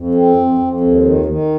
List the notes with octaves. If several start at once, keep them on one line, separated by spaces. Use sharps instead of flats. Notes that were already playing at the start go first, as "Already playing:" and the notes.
Already playing: F2
C4
F2
F2
D#2
D#3
D#3